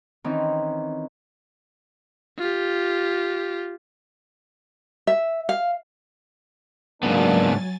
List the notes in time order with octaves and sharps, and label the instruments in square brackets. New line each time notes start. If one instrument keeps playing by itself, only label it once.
[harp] D#3 E3 C4 C#4 D#4
[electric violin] F4 G4
[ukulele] E5
F5
[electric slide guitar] G#2 C#3 B3 [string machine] F#3 G#5 A6 [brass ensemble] A#3 D4